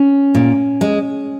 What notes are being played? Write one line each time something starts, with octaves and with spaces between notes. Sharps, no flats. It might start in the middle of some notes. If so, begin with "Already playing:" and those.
Already playing: C#4
A#2
G#3